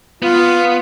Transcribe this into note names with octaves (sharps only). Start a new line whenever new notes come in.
B3 F4